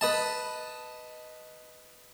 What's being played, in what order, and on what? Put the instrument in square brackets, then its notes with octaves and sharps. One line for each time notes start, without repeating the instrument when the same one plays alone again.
[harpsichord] B4 D#5 A5